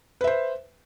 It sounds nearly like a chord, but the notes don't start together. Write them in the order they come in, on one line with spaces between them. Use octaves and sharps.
B4 E5 C5